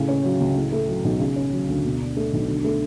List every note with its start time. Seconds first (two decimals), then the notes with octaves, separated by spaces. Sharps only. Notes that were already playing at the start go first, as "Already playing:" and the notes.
Already playing: A2 C#3
0.08 C#4
0.24 F#3
0.40 C#2
0.56 A2
0.72 A3
0.88 F#3
1.04 B1
1.20 C#3
1.36 C#4
1.52 F#3
1.68 D2
1.84 B2
2.00 D4
2.17 A3
2.33 B1
2.49 D3
2.64 A3